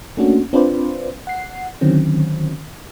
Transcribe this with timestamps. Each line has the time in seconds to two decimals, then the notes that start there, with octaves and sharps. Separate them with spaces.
0.17 A3 A#3 C#4 D4 F#4
0.53 C4 D4 F4 B4 C5 D5
1.27 F#5 C7
1.81 D3 D#3 F#3 C4 C#4